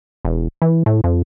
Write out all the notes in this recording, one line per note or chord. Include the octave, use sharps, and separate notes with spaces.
E1
E3
A2
F2